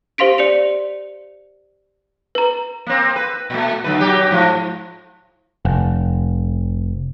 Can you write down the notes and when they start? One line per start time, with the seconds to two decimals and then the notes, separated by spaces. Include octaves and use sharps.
0.18 G4 C5 F5 C6 B6 D7
0.38 D5 C#7 F7
2.35 B4 A#5
2.86 A#3 C4
3.16 B4
3.50 A#2 A3
3.84 D3 F#3 B4
4.00 B2 F#3 G4
4.31 G#2 F3
5.65 F1